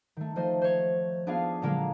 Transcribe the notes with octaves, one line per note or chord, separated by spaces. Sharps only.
D#3 A3
F3 A3 C5 D#5
C5 C#5
B3 D4 F4 G#4 F5
A#2 D3 F#3 G#3 A#3 A#4